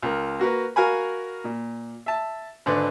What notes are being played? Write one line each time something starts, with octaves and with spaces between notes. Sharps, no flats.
C#2 A#4
A#3 F#4 A#4 B4
F#4 A#4 F5 G#5 B5
A#2
E5 A5
G#1 D3 B4 D5